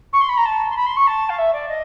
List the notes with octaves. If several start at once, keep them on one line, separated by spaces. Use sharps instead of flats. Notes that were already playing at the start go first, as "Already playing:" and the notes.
C#6
C6
B5
A#5
A5
C6
B5
C6
C#6
A5
F5
E5
D5
D#5